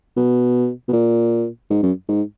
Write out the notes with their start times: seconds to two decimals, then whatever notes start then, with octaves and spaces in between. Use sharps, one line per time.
0.17 B2
0.88 B2
0.93 A#2
1.70 G#2
1.83 F#2
2.09 G#2